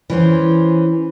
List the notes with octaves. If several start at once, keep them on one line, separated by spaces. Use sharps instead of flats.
E3 C#4 C5